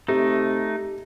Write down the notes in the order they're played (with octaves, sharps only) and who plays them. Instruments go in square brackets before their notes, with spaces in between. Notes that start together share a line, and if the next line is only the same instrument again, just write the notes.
[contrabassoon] C3 [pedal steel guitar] A3 D#4 [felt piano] G4